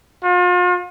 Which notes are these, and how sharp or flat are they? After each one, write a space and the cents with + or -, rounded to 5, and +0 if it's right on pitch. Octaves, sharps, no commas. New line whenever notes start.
F4 +40